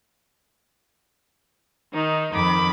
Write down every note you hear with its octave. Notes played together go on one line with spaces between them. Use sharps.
D#3 D#4
F2 D#3 B5 D6